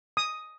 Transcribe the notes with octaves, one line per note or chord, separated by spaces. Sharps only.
D#6